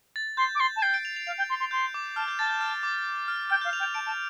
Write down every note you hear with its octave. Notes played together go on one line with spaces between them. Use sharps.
A6
C6 G6
D6
C6 A6
A5
G5 C7
D7
F7
F7
F5 F7
G5
C6
C6
C6 G6
D6
A5 F6
G6
A5 A6
G6
F6
D6
F6
G5 F6
F5 G6
F7
G5
F7
A5 D7
A5